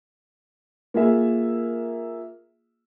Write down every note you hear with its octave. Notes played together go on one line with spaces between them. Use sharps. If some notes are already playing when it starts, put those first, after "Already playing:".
A#3 F4 G#4 E5